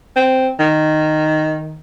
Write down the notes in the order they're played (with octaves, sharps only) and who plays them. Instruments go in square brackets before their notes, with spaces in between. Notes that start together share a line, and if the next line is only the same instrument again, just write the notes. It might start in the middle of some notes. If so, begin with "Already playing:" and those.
[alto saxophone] C4
D#3